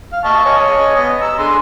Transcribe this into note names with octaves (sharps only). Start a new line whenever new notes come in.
F5
D#5 A5 C#6
C#5 D#5 G#5
B3 D#5
A#5 E6
D3 G#4 C6